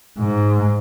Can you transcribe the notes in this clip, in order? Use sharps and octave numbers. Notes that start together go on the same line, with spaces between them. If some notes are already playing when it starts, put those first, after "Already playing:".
G#2